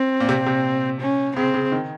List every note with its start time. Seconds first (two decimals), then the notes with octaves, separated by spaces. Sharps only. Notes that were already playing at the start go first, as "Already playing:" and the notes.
Already playing: C4
0.20 A#2
0.29 C3
0.46 C3
1.00 C#4
1.36 C#3 C4
1.54 C#3
1.72 D#3